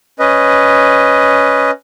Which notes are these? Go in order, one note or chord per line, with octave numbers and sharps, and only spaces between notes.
C#4 B4 D#5